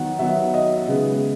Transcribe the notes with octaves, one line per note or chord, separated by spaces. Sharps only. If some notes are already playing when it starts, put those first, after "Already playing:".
Already playing: D#3 F#3 B3 F#5
D#3 F#3 B3 E5
D#5
C#3 G#3 B3